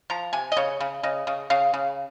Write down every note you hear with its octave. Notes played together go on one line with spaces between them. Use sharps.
F3 A#5
C3 G#5
D#5
C#3 C#5
C#3
C#3 D#5
C#3
C#3 F5
C#3